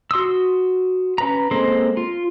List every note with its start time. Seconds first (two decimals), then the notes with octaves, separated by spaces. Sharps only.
0.11 F#4 C6 D#6 E6
1.18 C#4 B4 A#5
1.51 G#3 A#3 C4 A4 C5
1.97 F4